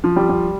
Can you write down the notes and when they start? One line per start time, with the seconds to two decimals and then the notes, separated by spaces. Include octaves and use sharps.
0.04 F3
0.16 G3
0.29 G3